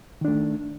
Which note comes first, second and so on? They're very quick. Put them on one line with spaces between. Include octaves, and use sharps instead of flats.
D#3 D4 A3